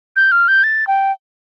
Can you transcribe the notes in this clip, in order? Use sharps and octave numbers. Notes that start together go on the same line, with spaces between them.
G6
F6
G6
A6
G5